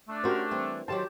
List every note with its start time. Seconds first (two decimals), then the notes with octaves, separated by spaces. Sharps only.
0.09 A3 D4
0.24 C#4 F#4 G4 A#4 C5
0.51 E3 G3 C4
0.88 D#3 E3 F#3 G4 C5 A5